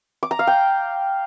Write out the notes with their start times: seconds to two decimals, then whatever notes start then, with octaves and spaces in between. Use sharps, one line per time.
0.23 D6
0.31 A#5
0.39 F5
0.47 G5